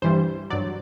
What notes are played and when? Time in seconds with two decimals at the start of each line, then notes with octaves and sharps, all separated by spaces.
0.02 G2 E3 G3 C5
0.50 G2 F#3 D5